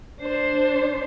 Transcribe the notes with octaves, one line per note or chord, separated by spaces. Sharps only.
D4 C5